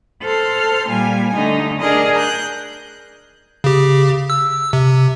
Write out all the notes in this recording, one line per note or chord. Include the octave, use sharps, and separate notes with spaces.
A4 C5 C6 F6
A#2 G3 A#3 G#5
D3 A3 D#4
D4 G#4 A#4 D5 D#5
F#6 G6
C#3 G4
E6
C3